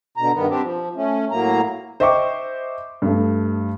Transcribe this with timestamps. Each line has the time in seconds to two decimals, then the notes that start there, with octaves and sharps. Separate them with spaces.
0.17 B2 D3 A#5
0.33 G2 D#3 B3
0.49 C4 D4 G4
0.61 F3
0.96 A3 C#4
1.31 A2 F#3 A#3 A#5
2.00 C5 D#5 E5 G5 C#6 D6
3.02 G2 A3